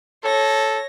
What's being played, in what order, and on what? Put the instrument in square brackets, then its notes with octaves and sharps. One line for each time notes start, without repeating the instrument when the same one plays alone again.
[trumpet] A4 [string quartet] C#5 A#6